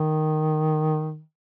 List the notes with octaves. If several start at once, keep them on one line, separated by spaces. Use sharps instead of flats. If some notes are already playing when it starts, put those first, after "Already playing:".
Already playing: D#3